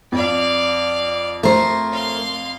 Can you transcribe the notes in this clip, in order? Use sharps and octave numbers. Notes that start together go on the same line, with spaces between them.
F2 D5 F5
A3 A#4 C5
F5 C6